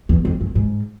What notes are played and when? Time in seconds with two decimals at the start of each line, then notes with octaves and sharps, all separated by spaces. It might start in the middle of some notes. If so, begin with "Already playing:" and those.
0.09 E2
0.25 F2
0.41 F#2
0.55 G#2